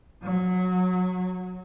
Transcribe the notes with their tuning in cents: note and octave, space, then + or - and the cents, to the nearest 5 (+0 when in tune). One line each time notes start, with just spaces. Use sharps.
F#3 -20